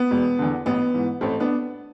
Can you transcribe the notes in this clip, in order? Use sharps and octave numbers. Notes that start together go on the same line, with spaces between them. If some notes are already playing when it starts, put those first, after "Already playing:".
Already playing: B3
E1
E2 D3
A1 B3
G#2 E3
A1 A3 C4
B3 D4